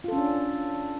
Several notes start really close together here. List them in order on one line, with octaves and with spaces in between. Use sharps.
F4 A4 C#4 D4